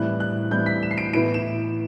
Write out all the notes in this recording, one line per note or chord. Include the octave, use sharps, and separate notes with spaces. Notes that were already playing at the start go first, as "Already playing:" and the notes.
Already playing: A2 E3 G3 C4 E4 F#6
F#6
A2 E3 G3 C4 E4 G6
B6
E7
C7
D7
A2 E3 B3 E4 D7
E7